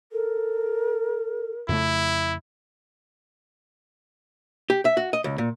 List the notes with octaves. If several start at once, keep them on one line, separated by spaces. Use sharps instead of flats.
A4 A#4
F2 C#3 A3 E4
G4
E5
F#4
D#5
C#2
A#2